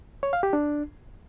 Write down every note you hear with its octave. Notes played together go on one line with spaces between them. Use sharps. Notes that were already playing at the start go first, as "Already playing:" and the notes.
C#5
F5
G4
D4